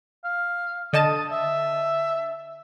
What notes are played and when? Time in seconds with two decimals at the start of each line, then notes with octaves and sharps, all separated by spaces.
0.25 F5
0.93 D3 D#5 A5 D#6
1.31 E5